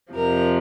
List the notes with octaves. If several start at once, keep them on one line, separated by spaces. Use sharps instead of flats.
F2 C3 F3 A#4